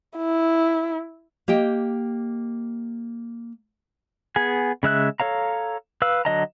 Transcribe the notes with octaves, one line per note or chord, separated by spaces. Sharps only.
E4
A#3 G4 D#5 G5
B3 G#4 G#5
C#3 G#3 E5 F#6
A4 C#5 F5 A#5
B4 F5 E6
D3 F#3 D#5 A5 A#5